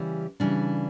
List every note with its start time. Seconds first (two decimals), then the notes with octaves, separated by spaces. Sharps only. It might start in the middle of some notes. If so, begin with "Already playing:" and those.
Already playing: C#3 E3 G3 C#4 G4
0.40 C#3 E3 G3 D4